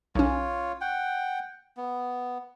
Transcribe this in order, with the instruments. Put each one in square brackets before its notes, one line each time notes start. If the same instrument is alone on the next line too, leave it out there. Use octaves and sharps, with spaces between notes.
[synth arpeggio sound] B1 C#4 [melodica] F4 C#5
[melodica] F#5 G5
B3